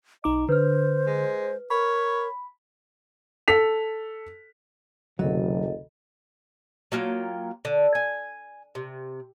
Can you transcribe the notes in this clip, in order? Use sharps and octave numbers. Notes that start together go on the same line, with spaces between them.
B1 D#4 D#5 A#5 D6
D3 B4 C5 F6
G#3
A#4 C#5 B5
A4 B6 F7
F#1 D2 C3 F#3 A4 D#5
F#3 A#3 F4 G5
D3
G#5
C3